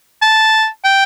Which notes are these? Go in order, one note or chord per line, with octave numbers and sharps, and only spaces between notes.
A5
G5